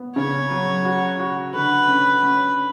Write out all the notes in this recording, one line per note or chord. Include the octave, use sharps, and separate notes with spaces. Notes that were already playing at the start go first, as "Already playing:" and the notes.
Already playing: B3
C#3 C#5
F#3
F#4
F#4
D3 B4
C#4
C#4